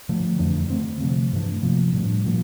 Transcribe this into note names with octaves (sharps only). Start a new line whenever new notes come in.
D3 F3 A3
F2 E3 A3 D4
D3 A3 C4
C3 F3 A3
G2 E3 A3 D4
C3 F3 A#3
A2 G3 D4
A#2 F3 A#3